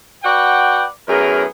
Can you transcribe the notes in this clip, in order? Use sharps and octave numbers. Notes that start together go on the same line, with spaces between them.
F#4 B4 D5 F#5 G5
F#2 A2 B3 G#4 A#4